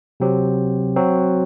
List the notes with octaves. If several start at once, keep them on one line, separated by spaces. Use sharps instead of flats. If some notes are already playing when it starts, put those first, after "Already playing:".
C3 F#3 C4 G4
F#3 C4 F#4